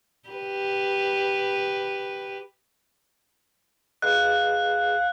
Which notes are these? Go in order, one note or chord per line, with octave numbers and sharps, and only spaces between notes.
G4 B4
G#4 B4 D#5 F5 F#6